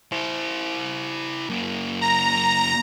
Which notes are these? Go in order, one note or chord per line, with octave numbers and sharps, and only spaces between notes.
E4 C5
F#2 A#3
A#5